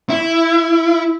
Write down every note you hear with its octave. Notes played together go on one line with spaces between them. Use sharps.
E4